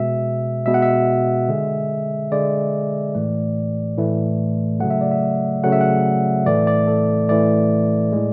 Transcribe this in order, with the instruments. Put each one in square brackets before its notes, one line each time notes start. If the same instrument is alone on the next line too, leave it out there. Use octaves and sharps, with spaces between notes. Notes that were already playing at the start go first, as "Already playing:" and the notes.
Already playing: [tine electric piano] B2 G#3 E5
B2 G#3 E5
F#5
E5
D3 G#3
D3 G#3 D5
A2 E3 A3
A2 E3 A3
C#3 F#3 A3 F#5
E5
D5
E5
C#3 F#3 A3 F#5
E5
F#5
A2 E3 A3 D5
D5
A4
A2 E3 A3 D5
A2 G#3